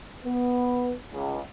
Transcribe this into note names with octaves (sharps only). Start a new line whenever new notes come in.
B3
C#2